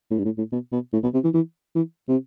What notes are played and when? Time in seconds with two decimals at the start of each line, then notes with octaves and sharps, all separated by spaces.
0.11 A2
0.18 G2
0.25 A2
0.38 A2
0.52 B2
0.72 B2
0.93 A2
1.03 B2
1.14 C3
1.24 E3
1.34 E3
1.75 E3
2.08 C3